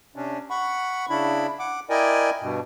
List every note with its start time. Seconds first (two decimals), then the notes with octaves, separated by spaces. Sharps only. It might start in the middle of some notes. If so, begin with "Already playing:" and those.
0.16 C3 C#4 D4
0.50 F#5 B5 C#6
1.10 C#3 D4 E4 B5
1.59 F#5 D6
1.90 E4 A#4 D5 D#5 G5 G#5
2.42 G2 B2